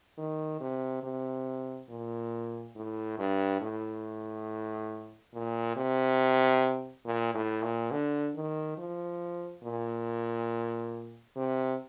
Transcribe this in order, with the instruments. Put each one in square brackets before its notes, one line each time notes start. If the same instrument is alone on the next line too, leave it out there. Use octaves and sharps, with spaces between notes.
[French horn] D#3
C3
C3
A#2
A2
G2
A2
A#2
C3
A#2
A2
A#2
D3
D#3
F3
A#2
C3